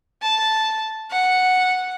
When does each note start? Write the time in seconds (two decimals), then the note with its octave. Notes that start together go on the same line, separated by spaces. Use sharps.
0.22 A5
1.11 F#5